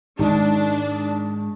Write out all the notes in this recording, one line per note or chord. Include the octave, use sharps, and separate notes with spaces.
G#2 D#3 G#3 D4 A5